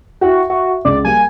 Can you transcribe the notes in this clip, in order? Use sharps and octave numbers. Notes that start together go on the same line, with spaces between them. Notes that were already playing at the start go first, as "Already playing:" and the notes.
E4 F#4 E5 G5
F#4 E5
C#2 D5
G3 A#3 G#5